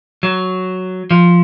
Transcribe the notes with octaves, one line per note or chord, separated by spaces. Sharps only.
F#3
F3